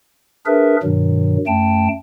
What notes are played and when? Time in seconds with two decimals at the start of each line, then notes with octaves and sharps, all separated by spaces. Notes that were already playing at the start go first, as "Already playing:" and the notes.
0.46 D4 G#4 A#4 B4 E5
0.83 G2 B2 D#3 F#3
1.47 F#2 A3 G5 A5